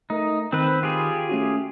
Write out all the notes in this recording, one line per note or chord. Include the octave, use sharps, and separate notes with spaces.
A3 D#4 A#4
D#3 C4 B4
F4 G4 G#4
A3 C#4 F#4